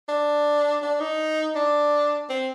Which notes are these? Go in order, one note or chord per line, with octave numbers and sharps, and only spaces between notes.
D4
D4
D#4
D4
C4